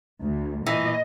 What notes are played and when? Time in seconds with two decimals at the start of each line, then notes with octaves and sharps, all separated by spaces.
0.22 D2
0.66 A#2 E3 D#5